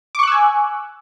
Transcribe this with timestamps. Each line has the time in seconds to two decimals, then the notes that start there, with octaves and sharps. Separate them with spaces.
0.15 D6
0.19 C#6
0.23 F#6
0.27 E6
0.32 G#5